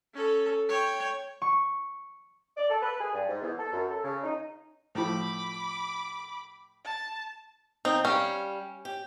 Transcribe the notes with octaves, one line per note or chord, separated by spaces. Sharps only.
C#4 A4
C#5 G5
C#6
D5
A4
B4
G#4
G2
G#2
E2
A4
F#2
A4
C#3
D#4
A2 F3 B5 D6
A5
F3 C4 D#4
G3 C#4 F5
G4